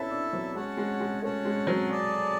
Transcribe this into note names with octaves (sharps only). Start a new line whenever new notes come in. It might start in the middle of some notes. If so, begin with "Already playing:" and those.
Already playing: B3 C#4 D4 E4 A4 E5 A5
D4
F#3
G#3 C#4 F#4 C#5 F#5 A5
G#3
G#3
A3 C#4 F#4 C#5 F#5 A5
G#3
F#3
G#4 D5 A5